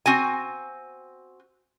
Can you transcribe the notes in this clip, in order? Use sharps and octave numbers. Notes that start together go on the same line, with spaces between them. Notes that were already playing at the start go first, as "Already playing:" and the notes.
C4 F#4 G#5